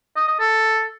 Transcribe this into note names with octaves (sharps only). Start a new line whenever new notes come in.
D#5
D#5
A4